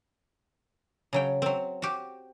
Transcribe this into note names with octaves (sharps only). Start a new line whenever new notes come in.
C#3 F#3 G5
F#3 C4
F#4 G4